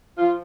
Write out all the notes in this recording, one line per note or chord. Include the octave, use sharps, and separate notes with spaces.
F3 F4